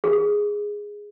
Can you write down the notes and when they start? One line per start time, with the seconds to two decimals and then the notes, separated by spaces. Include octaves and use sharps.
0.04 G#4